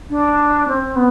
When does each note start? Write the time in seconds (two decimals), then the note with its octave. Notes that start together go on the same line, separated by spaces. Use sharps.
0.10 D4
0.68 C4
0.95 B3